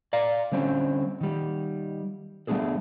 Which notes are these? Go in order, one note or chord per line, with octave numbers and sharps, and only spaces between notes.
D5 F5 A#5
D3 G3 C4 C#4
D#3 G3
G3 A3 B3 D4 G#4 A4